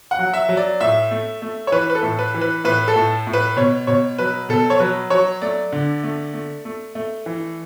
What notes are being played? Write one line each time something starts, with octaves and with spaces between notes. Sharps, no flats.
F#5
F#3
E5
F#3
D5
A2 E5
A3
A3
C#5
E3 B4
B4
A4
A2
B4
E3
B4
A2 B4
A4
A2
A2
B4
B2 C#5
B2 C#5
F#3 B4
B2 A4
C#5
F#3 B4
F#3 C#5
A3 D5
D3
A3
A3
A3
A3
E3